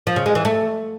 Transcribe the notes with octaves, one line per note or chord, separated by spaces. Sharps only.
F3
C#3
G#3
E3
A3